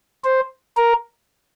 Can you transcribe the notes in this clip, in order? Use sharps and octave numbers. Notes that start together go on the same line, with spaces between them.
C5
A#4